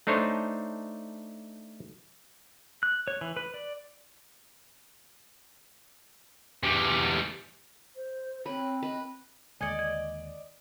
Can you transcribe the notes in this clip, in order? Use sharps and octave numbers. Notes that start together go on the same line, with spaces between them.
A3 D4 D#4 C5 C#5
F#6
C#5
E3
B4
D5
E2 G3
C5
C4 B4 C#5
B4 D#5
D#2 D3 G#3 D5 D#5 G#5 G#6 C#7
G#6